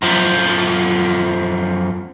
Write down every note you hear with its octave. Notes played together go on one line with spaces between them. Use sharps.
F#2 F3